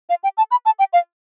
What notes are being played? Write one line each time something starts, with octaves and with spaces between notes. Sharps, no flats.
F5
G5
A5
B5
A5
G5
F5